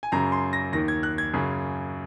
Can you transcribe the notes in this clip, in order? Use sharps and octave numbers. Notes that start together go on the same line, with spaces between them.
G#5
F#2 C#3 A#5
C6
A#6
D#2 D#3 A#6
G#6
F#6
G#6
F#2 C#3